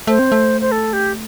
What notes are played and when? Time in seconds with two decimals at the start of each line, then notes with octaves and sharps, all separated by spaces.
0.07 A3 C5
0.19 C4
0.32 A3
0.61 C5
0.72 A4
0.93 G4